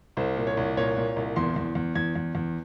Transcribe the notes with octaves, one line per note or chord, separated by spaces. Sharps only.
C2 C5
A#2
C#5
C2
A#2 C#5
A#2
C2
E2 C6
E2
E2
E2 G#6
E2
E2